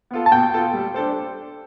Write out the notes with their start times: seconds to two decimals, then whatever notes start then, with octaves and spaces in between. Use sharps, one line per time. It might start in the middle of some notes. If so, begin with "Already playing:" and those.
0.11 B3 F4 A4
0.26 A5
0.31 B2 G5
0.53 B3 F4 A4
0.74 G3
0.94 D4 A4 C5